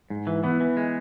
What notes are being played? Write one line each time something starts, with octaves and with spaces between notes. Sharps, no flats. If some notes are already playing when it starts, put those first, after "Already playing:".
G#2
E3
E3 B3
E3
G#3